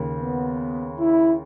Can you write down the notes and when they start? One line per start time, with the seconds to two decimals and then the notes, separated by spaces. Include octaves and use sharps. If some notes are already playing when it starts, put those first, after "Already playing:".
Already playing: D#2 C#3
0.22 B3
0.99 E4